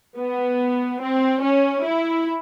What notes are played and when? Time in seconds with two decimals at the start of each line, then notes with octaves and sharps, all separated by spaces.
0.17 B3
1.00 C4
1.41 C#4
1.83 E4